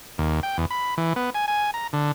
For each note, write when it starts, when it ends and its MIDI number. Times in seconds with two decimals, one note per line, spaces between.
0.18 0.41 39
0.43 0.57 79
0.58 0.66 40
0.71 0.95 83
0.98 1.13 52
1.16 1.30 59
1.35 1.46 80
1.48 1.71 80
1.74 1.87 82
1.93 2.12 50